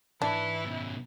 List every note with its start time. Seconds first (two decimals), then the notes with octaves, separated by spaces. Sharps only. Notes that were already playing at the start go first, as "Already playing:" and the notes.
0.22 G#2 E3 D4 E4 B4
0.65 F#2 B2